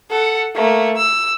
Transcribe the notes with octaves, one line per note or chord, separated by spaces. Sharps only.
A4 F#5
A3 A#3
E6